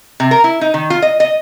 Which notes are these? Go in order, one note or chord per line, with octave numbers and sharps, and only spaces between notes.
C3
A#4
E4
D#4
D#3
F4
D#5
D#5